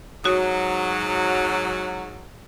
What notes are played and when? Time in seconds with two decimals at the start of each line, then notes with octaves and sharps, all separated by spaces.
0.24 G#2 F#3 F#4 C#5 D#6